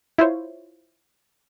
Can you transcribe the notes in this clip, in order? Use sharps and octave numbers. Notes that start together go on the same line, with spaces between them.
E4 F4 C5 C#5